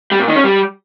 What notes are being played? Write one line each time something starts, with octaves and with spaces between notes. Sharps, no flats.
G3
A#2
D#3
C#4
G3